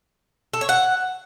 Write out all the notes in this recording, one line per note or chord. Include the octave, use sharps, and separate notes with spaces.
A4
C#5
F#5